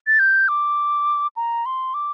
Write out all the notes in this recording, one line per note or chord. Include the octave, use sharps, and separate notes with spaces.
A6
G6
D6
A#5
C6
D6